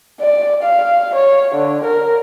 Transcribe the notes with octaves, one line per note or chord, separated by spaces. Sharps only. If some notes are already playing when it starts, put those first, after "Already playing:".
D5
F5
C#5
D3
A#4